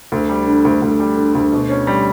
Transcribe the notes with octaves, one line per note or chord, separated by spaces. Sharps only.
D2
G3
D3
D2
D2
G3
D3
D2
B2
C#4
G3